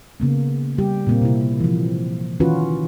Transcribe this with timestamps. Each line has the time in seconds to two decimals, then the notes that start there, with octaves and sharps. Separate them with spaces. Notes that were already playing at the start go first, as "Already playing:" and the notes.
0.20 C#3 A#3 B3
0.78 G3 G4
1.07 A#2 A#3 C4
1.22 C3 E4
1.60 E3 F3
2.40 D#3 E3 C#4 F4 F#4 B4